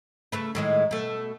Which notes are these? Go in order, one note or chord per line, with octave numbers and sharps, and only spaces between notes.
C#3 A3 B4
A2 D#3 G#3
B2 A3